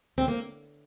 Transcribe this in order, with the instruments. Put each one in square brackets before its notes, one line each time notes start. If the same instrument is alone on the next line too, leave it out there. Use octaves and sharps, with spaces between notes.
[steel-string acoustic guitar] D2 C4
A#3